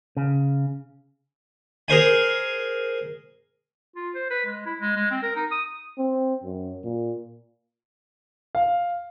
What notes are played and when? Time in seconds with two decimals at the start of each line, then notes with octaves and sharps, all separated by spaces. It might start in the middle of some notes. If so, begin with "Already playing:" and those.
0.17 C#3
1.88 G#4 A#4 C5 G#5
3.96 F4
4.15 C5
4.31 B4
4.46 G#3
4.66 E4
4.79 G#3
4.96 G#3
5.11 C4
5.23 A#4
5.36 D#4
5.51 D#6
5.98 C4
6.44 F#2
6.84 A#2
8.55 F5